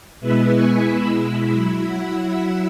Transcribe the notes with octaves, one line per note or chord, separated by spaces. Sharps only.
B2 G#3 B3 E4 B4 E5
G#5 C#6
B2 G#3 E4 B5 E6
F#3 E4
F#5 B5